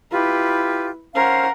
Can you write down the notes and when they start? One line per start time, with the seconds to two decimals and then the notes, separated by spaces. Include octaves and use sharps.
0.12 E4 F4 G4 B4
1.15 C#4 A#4 C5 F5 F#5